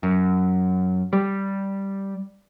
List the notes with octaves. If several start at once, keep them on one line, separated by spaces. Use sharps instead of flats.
F#2
G3